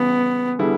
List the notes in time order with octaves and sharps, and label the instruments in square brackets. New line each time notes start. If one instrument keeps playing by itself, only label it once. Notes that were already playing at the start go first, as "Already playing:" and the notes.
Already playing: [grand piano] C#3 E3 G3 [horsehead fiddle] B3
[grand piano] D3 G3 B3 E4 G#4